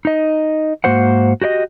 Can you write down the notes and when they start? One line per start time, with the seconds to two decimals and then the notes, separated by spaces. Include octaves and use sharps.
0.05 D#4 D#5
0.84 G#2 A#3 F#4 C5 F#5
1.42 F#4 G4 D5 D#5